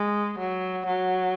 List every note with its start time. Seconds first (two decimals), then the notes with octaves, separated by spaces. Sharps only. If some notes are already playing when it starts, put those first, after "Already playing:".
Already playing: G#3
0.39 F#3
0.86 F#3